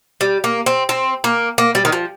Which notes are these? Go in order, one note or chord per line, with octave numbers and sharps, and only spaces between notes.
G3
A#3
C4
C4
A#3
A#3
G3
D#3
F3